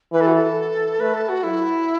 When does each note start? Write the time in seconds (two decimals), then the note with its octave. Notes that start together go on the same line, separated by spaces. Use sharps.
0.12 E3 B4
0.21 A4
0.27 F#4
0.35 A4
1.00 A3 B4
1.14 A4
1.29 F#4
1.43 F#3 E4